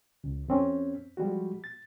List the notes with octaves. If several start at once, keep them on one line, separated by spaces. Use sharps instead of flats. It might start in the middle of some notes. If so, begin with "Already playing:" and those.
C#2
F2 C4 C#4
F3 G3 G#3 F#4
A6